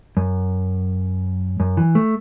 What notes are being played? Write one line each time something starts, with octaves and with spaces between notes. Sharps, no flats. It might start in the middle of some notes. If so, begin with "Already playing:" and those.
F#2
F#2
E3
A3